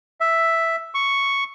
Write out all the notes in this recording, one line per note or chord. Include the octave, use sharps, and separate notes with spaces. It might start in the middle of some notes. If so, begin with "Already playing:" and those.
E5
C#6